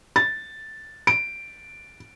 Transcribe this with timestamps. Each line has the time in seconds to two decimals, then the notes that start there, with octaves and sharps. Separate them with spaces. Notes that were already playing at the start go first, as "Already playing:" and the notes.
0.16 A6
1.07 D7